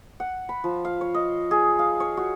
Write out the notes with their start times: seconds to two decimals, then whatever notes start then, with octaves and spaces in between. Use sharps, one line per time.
0.20 F#5
0.49 B5
0.64 F3
0.85 F5
1.01 C#5
1.14 D#5
1.51 G#4
1.79 F5
2.00 C#5
2.17 F#4